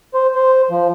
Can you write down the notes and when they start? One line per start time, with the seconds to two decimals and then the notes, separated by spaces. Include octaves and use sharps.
0.14 C5
0.35 C5
0.70 F3